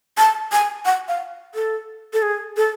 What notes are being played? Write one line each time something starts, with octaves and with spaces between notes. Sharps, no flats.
A5
G#5
F#5
F5
A4
A4
G#4
A4